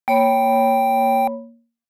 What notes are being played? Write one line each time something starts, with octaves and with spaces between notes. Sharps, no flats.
A#3 C#5 G5 B5